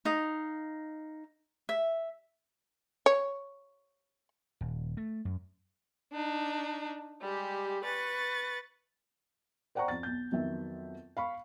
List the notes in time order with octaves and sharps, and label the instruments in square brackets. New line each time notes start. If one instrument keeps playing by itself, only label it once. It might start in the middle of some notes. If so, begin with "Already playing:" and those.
[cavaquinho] D#4 F5 D#6
E5
[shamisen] C#5
[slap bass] D#1
A3
F#2
[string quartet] D4 D#4
G3 G#3 G4
B4 C#6 A6
[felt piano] C5 D5 F#5 G5 A#5 C#6
F2 A6
B1 G6
F2 D#3 F#3 B3 E5
F5 B5 C#6